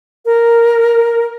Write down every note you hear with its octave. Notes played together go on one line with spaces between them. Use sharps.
A#4